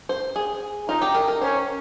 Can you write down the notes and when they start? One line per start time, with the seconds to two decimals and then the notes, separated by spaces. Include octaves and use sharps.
0.09 C5
0.36 G#4
0.89 D#4 F4
1.02 G4
1.14 A#4
1.28 A#4
1.41 C#4 C5